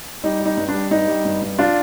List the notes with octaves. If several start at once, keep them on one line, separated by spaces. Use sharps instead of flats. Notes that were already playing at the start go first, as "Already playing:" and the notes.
G3 D#4
G3
D#4
G2
D4
G3
G2 D#4
G3
G2
G2
D4 F4